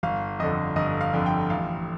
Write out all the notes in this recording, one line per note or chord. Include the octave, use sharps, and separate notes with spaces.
G1 F5
F2 D3 D#5
G1 D#5
F5
F2 D3
G5
A1 F5